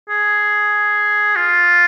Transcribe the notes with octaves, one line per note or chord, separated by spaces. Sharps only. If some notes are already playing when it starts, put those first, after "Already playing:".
G#4
F4